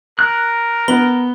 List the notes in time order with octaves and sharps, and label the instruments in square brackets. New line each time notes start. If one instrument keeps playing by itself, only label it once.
[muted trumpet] A#4 [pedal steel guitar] F#6
[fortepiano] B3 [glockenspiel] B5 G7